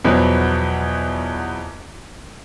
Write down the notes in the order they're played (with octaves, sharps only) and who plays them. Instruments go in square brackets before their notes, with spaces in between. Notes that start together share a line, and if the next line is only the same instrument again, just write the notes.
[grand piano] E2 B2 F3 F#3 B3